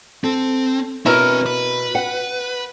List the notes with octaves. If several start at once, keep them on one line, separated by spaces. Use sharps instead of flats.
C4 A4
B2 C4 E4 A#4 C#5
B4
F#5